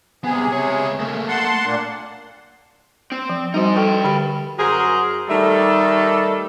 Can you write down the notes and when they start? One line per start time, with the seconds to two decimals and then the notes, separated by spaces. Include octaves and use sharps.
0.24 C2 C3 B3 G#4
0.53 C#2 C#5
1.00 A3 A#3
1.28 F#5 A5 C6
1.65 A#2 A#3 D4
3.12 C4
3.29 F3
3.54 G3 D#4 F#4 C5
3.77 A4 B4 G5 C#6
4.04 D3 G4 B5
4.58 F#2 F#4 G#4 A#4 C5
5.29 D#3 G3 A3 A4